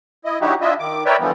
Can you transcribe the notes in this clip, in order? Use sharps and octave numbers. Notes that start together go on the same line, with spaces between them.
E4 D#5
D3 F#3 D#4 E4 F#4 G4
D4 E4 F4 D#5 E5
D#3 D6
A#4 B4 C#5 D5 E5 G5
D3 E3 F3 G3 B3